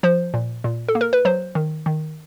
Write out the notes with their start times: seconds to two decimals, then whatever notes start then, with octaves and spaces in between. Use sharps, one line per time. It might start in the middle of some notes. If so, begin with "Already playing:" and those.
0.03 F3 C5
0.34 A#2
0.64 A#2
0.89 A4
0.95 A#3
1.01 A#4
1.13 B4
1.25 F#3 C5
1.55 D#3
1.86 D#3